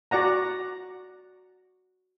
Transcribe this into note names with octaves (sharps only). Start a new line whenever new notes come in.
F#4 D5 F#5 A#5